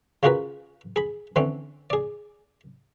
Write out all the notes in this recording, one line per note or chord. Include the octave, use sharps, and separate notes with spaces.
C#3 F4 F#4 G#4 A#4 B4
G#4 B5
D3 E3 C4 C#4
G#4 D5